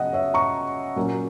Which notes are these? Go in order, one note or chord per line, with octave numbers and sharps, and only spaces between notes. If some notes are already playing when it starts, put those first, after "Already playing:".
Already playing: C#3 F#3 C#4 D#5 F#5
C#5 E5
A#5 C#6
A#2 F#3 A#3 C#4